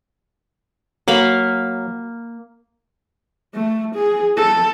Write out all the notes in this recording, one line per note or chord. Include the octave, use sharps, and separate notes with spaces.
F#3 A#3 F5 B5
A3
G#4
A4